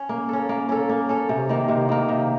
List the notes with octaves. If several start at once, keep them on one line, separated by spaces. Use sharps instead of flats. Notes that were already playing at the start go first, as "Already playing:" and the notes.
Already playing: C#4
A#3
C#4 A4
A#3
C#4 A4
A#3
C#4 A4
C3
D#3 A#3
C3
D#3 A#3
C3